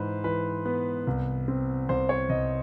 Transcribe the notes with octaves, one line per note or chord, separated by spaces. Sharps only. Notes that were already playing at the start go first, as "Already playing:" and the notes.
Already playing: G#2 E3 B4 C5
E3 B4
B3
C2
C4
C2 C5
C#5
C2 D#5